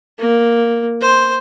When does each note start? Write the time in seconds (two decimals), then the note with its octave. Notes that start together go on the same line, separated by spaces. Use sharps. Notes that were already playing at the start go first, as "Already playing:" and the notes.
0.19 A#3
1.01 C5